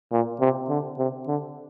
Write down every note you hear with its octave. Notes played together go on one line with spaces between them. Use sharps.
A#2
C3
D3
C3
D3